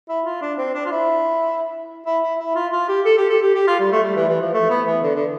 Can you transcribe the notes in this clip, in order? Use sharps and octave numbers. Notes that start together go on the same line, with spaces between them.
E4
F4
D4
C4
D4
F4
E4
E4
E4
E4
F4
F4
G4
A4
G4
A4
G4
G4
F4
G3
A3
G3
E3
E3
F3
A3
B3
E3
D3
D3